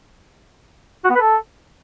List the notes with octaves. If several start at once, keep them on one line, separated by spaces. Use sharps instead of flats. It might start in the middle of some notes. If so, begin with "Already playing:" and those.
F#4
B3
B4
A4